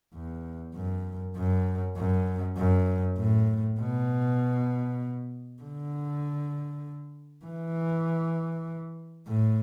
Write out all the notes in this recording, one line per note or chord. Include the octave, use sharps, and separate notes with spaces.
E2
F#2
F#2
F#2
F#2
A2
B2
D3
E3
A2